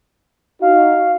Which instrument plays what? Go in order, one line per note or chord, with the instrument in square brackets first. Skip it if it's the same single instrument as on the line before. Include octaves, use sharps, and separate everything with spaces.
[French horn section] D#4 F#4 [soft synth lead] F5